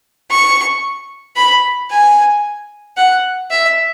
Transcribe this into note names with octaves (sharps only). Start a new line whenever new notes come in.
C#6
B5
G#5
F#5
E5